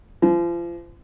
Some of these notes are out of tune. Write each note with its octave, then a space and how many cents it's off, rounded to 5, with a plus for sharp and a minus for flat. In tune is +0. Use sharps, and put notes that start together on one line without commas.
F3 -35